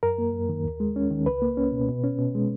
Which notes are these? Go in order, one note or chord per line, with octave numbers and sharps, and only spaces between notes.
F#2 A#4
A#3
F#2
D#3
D#2
G#3
C#4
D#3
C#2 B4
A#3
C#4
B2
B2
C#4
B2
G#3